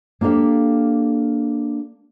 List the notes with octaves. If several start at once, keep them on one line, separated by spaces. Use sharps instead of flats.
A#3 D4 G4 A4 F5